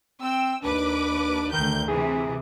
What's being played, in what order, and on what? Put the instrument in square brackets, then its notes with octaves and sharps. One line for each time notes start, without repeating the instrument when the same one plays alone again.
[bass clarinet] C4 [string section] G5 E6
[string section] D#2 B4 D6 [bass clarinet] D4
[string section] D2 G6 [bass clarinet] D#3
[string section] C3 E3 [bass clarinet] G#4